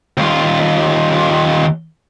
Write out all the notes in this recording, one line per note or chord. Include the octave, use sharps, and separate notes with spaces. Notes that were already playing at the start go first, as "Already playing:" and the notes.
D#2 F4